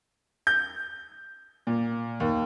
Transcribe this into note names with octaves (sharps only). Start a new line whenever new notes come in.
G6
A#2
D#2